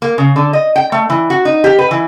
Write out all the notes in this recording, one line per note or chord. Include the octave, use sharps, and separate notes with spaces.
A#3
C#3
D3
D#5
G5
A3
E3
F#4
D#4
G4
B4
E3